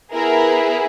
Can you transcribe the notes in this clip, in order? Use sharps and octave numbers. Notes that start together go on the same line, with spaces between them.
B3 E4 G#4 A#4